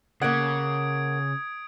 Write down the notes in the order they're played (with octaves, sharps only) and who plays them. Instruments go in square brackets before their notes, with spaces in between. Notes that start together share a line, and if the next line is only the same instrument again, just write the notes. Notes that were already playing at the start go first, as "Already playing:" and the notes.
[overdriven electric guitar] C#3 [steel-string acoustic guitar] A#3 F#5 [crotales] D#6 G#6 D7